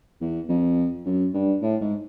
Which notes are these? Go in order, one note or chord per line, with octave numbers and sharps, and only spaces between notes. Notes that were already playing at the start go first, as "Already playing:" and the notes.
E2
F2
F#2
G2
A2
G#2